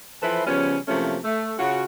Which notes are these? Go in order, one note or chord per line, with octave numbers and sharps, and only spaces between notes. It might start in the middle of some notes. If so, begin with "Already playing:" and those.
E3 F3 E4 A4 B4 C5
C#3 F3 G3 B3 C#4
C3 F3 F#3 A3 A#3 C#4
A3
C#3 C#4 F4 F#4